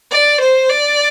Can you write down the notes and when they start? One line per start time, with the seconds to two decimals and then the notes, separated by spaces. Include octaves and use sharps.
0.11 D5
0.41 C5
0.70 D5